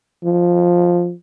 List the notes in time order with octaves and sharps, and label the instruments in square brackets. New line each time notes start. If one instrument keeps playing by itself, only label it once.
[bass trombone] F3